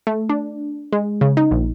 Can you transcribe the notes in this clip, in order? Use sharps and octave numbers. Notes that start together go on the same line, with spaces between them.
A3
D4
G#3
C#3
D#4
A#1